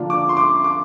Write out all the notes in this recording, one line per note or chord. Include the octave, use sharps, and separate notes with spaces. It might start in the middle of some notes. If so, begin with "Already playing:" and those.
Already playing: D3 F3 A#3 D4 F4
D6
C6
D6
D6